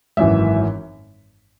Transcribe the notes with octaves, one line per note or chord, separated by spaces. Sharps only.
G#1 F#2 E3 E5